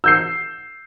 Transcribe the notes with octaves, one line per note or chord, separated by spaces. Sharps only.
E6 G6 C7